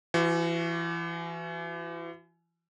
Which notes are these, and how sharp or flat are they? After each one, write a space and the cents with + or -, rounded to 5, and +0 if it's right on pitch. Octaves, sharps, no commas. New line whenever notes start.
E3 +35 F#4 +0